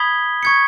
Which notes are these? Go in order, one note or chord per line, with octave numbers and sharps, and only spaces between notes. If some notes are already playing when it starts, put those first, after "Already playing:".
Already playing: B5 D#6 G#6 B6 G7
C#6 G#6 C#7